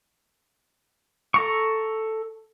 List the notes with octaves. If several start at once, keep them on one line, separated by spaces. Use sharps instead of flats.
A4 A#5 C#6